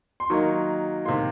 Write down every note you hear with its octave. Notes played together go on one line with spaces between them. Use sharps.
C6
D#3 F#3 A#3 D#4 C#6
C3 D#3 A#3 C6